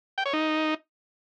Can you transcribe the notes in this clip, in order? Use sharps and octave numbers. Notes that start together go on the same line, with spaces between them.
G5
C#5
D#4